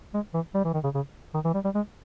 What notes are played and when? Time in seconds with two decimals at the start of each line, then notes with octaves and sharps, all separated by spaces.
0.14 G#3
0.34 E3
0.54 G3
0.64 E3
0.74 D#3
0.84 C#3
0.95 C#3
1.34 D#3
1.44 E3
1.54 G3
1.65 G3
1.75 G#3